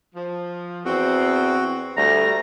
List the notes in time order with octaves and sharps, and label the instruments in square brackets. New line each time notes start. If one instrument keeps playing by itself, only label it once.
[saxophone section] F3
[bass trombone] E2 [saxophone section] C4 [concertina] F#4
[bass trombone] D2 [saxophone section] G3 [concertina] A3 A#5 [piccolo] A#6